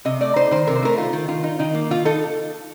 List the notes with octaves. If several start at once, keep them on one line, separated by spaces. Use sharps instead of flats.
C3 D#5
A3 D5
D#4 C5
D#3 C5
C3 A#4
C5
A3 A#4
D#4 F4
D#3
D#3 F4
D#4
D#3 D#4
A#3
D#3 F4
D#4 A4